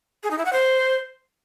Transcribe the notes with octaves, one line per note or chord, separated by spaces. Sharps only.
G#4
D#4
E4
F#5
C5